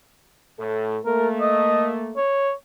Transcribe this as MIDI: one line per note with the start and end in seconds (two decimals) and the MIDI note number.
0.59 0.99 45
0.59 0.99 69
1.05 2.16 57
1.05 2.16 58
1.05 1.28 70
1.41 1.89 75
2.17 2.52 73